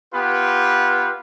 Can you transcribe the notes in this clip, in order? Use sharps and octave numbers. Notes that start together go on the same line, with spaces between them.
B3 F4 G4 B4